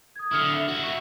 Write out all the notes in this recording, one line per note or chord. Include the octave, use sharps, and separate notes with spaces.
D#6 G#6
D3 E4 D#6 F6 C#7
E5
E4 F#4
C#6